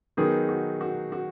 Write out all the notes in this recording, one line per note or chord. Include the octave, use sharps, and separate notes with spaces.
D#3 F#3 B3 D#4 G#4
F#4
F#4
F#4